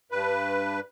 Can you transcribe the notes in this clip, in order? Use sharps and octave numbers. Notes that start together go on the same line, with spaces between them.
G2 B4